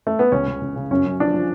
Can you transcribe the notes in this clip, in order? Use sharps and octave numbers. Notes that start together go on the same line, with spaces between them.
A3
B3
C#2 C#4
C#2
C#2
C#3
F#2 C#4
F#2
F3 D4
F3